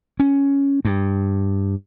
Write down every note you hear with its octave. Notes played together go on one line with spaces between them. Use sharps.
C#4
G2